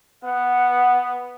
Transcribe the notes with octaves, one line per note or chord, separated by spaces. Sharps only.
B3 F#5